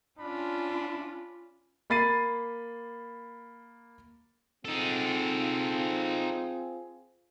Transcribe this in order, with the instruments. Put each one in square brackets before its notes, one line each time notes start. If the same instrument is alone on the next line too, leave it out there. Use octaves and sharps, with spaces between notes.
[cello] C#4 F4 [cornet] D4 [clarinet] B5
[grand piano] A#3 B5 A6 C7 D#7
[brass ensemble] C4 F4 G#4 [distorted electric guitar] D#4 A4